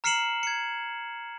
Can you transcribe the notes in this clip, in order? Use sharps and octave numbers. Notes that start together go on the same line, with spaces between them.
A#5 F6 C7 C#7 E7 F#7
G#6 C#7